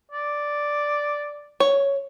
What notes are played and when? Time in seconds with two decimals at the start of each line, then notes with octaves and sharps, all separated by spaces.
0.12 D5
1.60 C#5